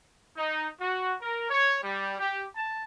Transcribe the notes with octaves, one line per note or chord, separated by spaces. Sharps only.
D#4
F#4
A#4
C#5
G3
G4
A5